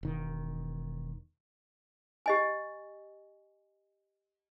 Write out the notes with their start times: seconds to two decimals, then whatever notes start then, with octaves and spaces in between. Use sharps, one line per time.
0.03 E1 D#3
2.26 G4 D#5 G#5